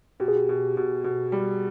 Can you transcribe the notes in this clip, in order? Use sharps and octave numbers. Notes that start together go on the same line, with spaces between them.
B2 G4
G#4
G4
B2
B2
B2
G3